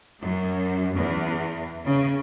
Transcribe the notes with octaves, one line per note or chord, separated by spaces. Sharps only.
F#2
E2
C#3